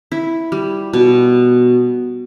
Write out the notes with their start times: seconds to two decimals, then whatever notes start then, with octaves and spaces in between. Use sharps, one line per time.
0.12 E4
0.52 G3
0.93 B2